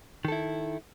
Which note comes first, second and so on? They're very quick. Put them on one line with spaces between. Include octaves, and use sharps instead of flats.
D#3 A4 E4